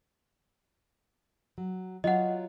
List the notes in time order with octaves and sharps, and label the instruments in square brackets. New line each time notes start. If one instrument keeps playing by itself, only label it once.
[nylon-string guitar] F#3
[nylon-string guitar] F#3 F4 F#4 [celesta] D#5 F#5